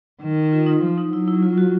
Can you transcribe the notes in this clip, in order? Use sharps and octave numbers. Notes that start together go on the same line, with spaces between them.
D#3
F4
D#4
F3
D#4
F#3 E4
E4
F4
F#4